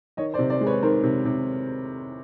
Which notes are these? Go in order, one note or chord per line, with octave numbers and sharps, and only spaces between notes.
D#3 C#5 D#5
C5 D5
C3
C5 D5
G#3
B4 C#5
D#3 A#4 C5
C3
C3